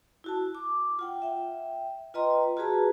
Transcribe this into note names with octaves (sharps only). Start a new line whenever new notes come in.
E4 F#4 A5
D6
F4 F#5 G5
E5 G5
F4 B4 D#5 G5 A#5 C6
F4 F#4 G#4 B4 A5 A#5